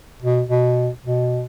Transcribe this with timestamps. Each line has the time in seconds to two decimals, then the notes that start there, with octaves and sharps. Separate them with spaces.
0.22 B2
0.50 B2
1.06 B2